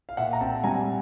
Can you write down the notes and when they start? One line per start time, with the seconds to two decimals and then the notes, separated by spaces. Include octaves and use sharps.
0.09 F5
0.17 A#2 E5 F#5
0.33 A#5
0.41 C4 G5 A5
0.64 G3 G#5 A#5